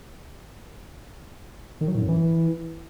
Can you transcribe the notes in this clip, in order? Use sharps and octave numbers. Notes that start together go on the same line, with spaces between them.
D#3
F#3
A2
F#2
E3